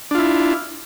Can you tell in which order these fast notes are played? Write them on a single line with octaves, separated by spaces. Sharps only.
D4 F4 E4